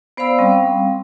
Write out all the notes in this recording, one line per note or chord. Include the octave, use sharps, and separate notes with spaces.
B3 C5 D5 F5 B5 E6
G3 C4 C#4 F5